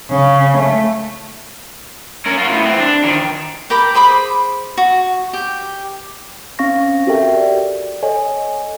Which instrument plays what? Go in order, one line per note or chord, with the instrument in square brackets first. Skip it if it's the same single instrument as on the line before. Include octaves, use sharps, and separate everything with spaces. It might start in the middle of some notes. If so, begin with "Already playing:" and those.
[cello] C#3
A3
[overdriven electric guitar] C#4 A#4
F4 F#4
A2 B3
E3 C4
D4
D#3 F3
[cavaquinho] G4 A#4 B5 D6
G#4 C5 B5 D6
F#4
G4
[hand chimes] C4 C#4 F5 C#6 A#6
F#4 G4 A4 A#4 E5 G5
D5
A4 C#5 D#5 G#5